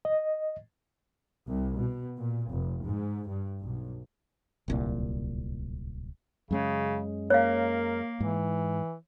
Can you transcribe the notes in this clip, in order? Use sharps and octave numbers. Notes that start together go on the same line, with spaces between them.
D#5
C2
B2
A#2
F1
G#2
G2
B1
D1 C2 A#2
F#2 C#3 G#3 C#4
A#3 A#4 C#5 F5
G#2 E3